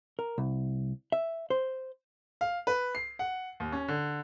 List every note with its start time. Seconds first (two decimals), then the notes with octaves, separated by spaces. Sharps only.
0.19 A#4
0.38 C2
1.12 E5
1.50 C5
2.41 F5
2.67 B4
2.95 C7
3.19 F#5
3.60 D#2
3.72 C#4
3.88 D3